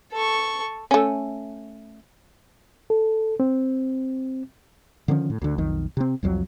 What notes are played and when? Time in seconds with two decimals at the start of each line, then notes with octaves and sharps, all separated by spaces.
0.12 A4 C#6
0.91 A3 C#4
2.90 A4
3.40 C4
5.08 D3 D#3 F3 C#4
5.30 A2
5.42 D2 D3
5.58 B1 F2 D#3
5.97 C3 C4
6.23 C2 F2 F3 F#3